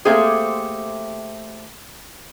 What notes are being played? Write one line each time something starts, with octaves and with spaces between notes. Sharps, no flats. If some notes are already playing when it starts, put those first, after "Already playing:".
A3 A#3 C4 G4 G#4 C5